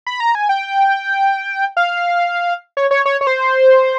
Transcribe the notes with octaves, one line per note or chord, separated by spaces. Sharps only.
B5
A#5
G#5
G5
F5
C#5
C#5
C#5
C#5
C5